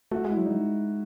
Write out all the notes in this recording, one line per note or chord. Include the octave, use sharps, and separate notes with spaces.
A3 F#4
G#3 E4
F#3
G#3 D#4